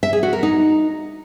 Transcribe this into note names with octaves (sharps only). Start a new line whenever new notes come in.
E5
G#4
F#4
A#4
D#4